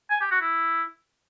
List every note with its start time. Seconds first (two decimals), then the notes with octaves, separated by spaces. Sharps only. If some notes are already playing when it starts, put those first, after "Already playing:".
0.10 G#5
0.21 G4
0.31 F#4
0.42 E4